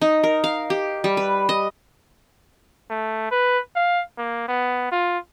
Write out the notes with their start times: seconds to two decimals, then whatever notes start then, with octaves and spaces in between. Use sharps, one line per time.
0.02 D#4
0.24 A#4
0.44 F5
0.70 G4
1.04 G3
1.17 B4
1.49 D#5
2.90 A3
3.31 B4
3.76 F5
4.18 A#3
4.48 B3
4.92 F4